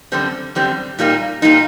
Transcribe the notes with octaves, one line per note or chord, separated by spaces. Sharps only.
F#2 D3 G3 C4
F#2 D3 G3 C4
A#2 G3 A#3 D#4
A#2 G3 A#3 D#4